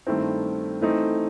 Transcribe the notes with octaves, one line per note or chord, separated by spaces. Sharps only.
G2 D#3 A3 C4 E4
E3 A3 C4 D#4